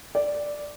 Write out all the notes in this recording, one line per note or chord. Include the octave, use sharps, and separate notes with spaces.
D5